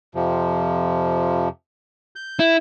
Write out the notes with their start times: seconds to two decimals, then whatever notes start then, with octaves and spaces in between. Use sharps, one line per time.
0.15 F2 C3 F3
2.16 G6
2.40 E4